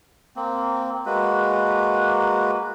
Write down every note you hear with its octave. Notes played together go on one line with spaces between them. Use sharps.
A#3 C4
G#3 A#3 F#4 B4